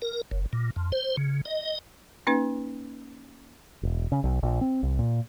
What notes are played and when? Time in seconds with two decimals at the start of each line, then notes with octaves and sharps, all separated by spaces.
0.02 A#4
0.31 F#1
0.53 A#2
0.76 F2
0.92 C5
1.17 C#3
1.45 D#5
2.27 A#3 C#4 D#4 B4
3.83 E1
4.12 C#3
4.24 B1
4.43 A#1
4.61 C4
4.83 C2
4.99 A#2